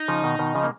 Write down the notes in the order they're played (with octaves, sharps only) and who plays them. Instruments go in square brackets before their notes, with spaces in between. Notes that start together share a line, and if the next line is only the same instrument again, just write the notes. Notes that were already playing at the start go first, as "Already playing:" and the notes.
Already playing: [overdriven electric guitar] D#4
[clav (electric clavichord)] C#3 F3
B2 D#3
B2 D#3
C#3 F3
A#3